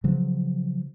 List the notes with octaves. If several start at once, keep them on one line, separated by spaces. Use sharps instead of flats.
C#3 F3 F#3